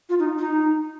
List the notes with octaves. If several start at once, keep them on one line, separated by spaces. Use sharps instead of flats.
F4
D#4
D#4